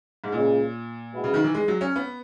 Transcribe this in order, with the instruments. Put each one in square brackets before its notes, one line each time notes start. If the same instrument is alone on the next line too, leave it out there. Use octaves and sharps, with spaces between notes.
[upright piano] G#2
[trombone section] C#2 C#3 G#3 [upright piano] A#2
[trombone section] B2 G#3 B3 E4
[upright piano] C#3
D#3
E3
G#3
F#3
C#4
B3